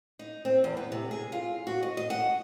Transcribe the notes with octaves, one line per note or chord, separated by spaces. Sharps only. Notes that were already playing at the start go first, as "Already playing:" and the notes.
D#4
C4
E2
B3
C3
G#4
F4
F#4
D#5
D#5
F#5